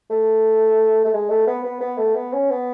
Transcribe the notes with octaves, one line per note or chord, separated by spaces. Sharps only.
A3
A3
G#3
A3
B3
B3
B3
A3
B3
C#4
B3